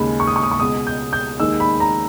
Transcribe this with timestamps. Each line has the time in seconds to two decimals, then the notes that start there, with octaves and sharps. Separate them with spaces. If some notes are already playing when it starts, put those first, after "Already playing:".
Already playing: D#2 C#3 G#3 B5
0.20 C#6
0.27 D#6
0.36 C#6
0.43 D#6
0.51 C#6
0.60 C#2 B2 G#3 D#6
0.87 G6
1.13 G6
1.40 D#2 D#3 G#3 E6
1.60 B5
1.80 A#5